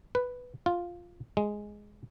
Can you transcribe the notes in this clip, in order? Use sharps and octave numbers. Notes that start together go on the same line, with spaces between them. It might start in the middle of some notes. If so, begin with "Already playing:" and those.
B4
F4
G#3